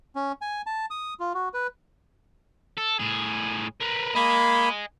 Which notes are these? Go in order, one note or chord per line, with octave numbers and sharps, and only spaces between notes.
C#4
G#5
A5
D#6
F4
F#4
B4
A4
A2 G#4
A#4 B4
A#3 D#5 G#5 B5